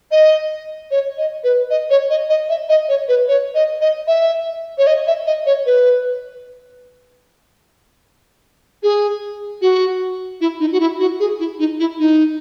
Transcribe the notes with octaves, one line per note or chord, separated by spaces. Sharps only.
D#5
C#5
D#5
B4
D#5
C#5
D#5
D#5
E5
D#5
C#5
B4
C#5
D#5
D#5
E5
C#5
D#5
E5
D#5
C#5
B4
G#4
F#4
E4
D#4
F#4
E4
F#4
G#4
E4
D#4
E4
D#4